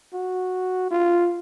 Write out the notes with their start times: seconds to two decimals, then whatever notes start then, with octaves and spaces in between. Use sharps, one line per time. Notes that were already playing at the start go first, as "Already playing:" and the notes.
0.13 F#4
0.91 F4